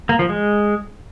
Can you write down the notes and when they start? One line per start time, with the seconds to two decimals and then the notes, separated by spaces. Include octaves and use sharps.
0.09 A#3
0.19 F3
0.29 G#3